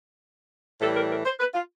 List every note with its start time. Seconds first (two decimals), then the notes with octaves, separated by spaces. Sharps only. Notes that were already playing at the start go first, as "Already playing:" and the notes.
0.80 A2 E3 G3 A4
0.96 A#4
1.10 A#4
1.25 C5
1.40 B4
1.54 F4